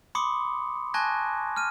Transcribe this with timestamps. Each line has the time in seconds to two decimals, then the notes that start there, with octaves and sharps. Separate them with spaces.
0.15 B5 C6 D6 D#6 C#7
0.94 G#5 A5 C#6 F#6 G#6 A#6
1.56 F6 D#7